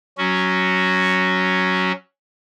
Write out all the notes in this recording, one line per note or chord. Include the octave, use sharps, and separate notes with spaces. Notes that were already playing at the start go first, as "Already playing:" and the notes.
F#3 C#4 F#4